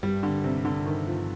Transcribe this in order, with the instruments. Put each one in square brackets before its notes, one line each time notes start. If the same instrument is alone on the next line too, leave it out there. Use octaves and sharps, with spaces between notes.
[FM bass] G2 [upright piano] G3
[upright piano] D3
C3
D3
D#3
F3